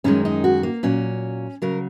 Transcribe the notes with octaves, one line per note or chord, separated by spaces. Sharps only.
F#2 D#3 G#3 C#4
D#4
F#4
A#3
A#2 F#3 C#4
C#3 F#3 A#4